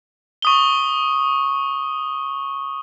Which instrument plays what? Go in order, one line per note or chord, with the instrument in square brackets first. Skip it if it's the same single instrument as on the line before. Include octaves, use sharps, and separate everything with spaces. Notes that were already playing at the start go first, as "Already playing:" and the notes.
[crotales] C#6 D#6 G7